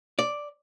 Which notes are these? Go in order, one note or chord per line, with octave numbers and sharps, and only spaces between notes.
D5